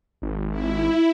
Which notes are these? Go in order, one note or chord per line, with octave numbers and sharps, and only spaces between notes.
G#1
E4